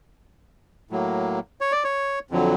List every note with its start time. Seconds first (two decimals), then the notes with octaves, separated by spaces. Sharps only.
0.91 A2 F#3 A#3
1.61 C#5
1.72 D5
1.84 C#5
2.31 F2 D3 F#3